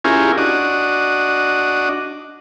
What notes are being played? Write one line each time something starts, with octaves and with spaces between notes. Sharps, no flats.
C#4 E4 F4 G4 G#4 A#4
D4 F#4 D#5